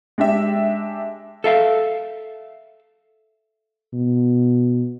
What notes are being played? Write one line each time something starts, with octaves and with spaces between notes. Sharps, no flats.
G#3 D4 G4 E5
A4 E5 F5
B2